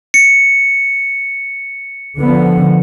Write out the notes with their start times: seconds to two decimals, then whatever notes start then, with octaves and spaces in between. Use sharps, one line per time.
0.14 C#7
2.18 D3 F3 B3